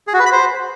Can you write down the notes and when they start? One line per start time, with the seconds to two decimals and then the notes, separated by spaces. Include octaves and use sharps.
0.07 G#4
0.14 F#4
0.20 B4
0.26 B5
0.32 C5